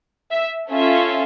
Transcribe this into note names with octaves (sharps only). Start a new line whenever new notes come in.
E5
C#4 F4 A4 E5